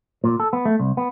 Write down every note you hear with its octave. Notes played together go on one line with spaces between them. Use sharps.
A#2
A4
B3
A3
C2
B3